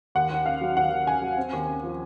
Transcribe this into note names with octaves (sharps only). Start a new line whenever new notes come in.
D#2 F#5
D#2
C#3 F5
F#3
D#2 F#5
D#2
C#3 G#5
F#3
C4
D#2
C#3
F3